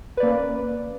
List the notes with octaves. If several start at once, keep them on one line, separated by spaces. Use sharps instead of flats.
A#3 C#4 B4 D5